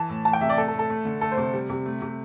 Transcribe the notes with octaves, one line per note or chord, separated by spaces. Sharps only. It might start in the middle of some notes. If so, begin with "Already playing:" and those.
Already playing: E3 A5
A2
E3 A5
G5
C3 E5
D5
A3 A4
A4
A2
A4
A3
D3
A3 A4
C5
C3
G3
C3
A3
C3